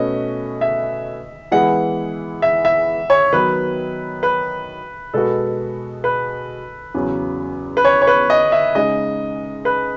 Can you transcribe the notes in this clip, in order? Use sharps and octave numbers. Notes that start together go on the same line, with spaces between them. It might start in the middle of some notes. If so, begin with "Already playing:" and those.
Already playing: B2 A3 C#4 F#4 B4 D#5
E5
E3 G#3 B3 E4 G#4 F#5
E5
E5
C#5
D#3 F#3 B3 B4
B4
B2 G#3 B3 F#4 A4
B4
E2 C#3 F#3
B4
C#5
C#5
B4
D#5
E5
C#3 G#3 D#4 D#5
B4